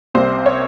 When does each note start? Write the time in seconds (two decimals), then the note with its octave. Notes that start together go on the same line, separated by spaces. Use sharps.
0.14 C2 C3 G3 A#3 C5
0.46 C#5